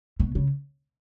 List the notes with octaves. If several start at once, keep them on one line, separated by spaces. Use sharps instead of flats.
B2
C#3